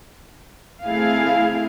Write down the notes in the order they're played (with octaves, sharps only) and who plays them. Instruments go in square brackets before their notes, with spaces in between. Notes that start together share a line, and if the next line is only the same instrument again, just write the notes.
[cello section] A3 C4 E4 G#4 F5